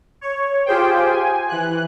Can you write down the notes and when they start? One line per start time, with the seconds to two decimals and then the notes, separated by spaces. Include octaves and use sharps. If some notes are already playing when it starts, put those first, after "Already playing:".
0.21 C#5
0.66 F4 G4 G#4 C5 G5
1.10 G#5
1.49 E3 F#6